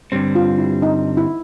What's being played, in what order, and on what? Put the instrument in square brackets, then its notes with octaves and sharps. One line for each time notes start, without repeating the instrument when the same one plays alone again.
[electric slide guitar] G2 D3 G3 C4
[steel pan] F4
E4
D#4
E4